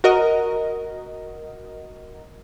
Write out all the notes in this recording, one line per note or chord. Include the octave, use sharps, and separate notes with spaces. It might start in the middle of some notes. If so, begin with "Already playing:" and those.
F#4 A#4 D#5